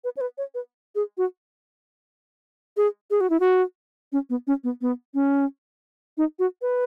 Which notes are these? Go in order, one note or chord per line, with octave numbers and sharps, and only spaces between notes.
B4
C#5
B4
C#5
B4
G#4
F#4
G#4
G#4
F#4
E4
F#4
C#4
B3
C#4
B3
B3
C#4
D#4
F#4
B4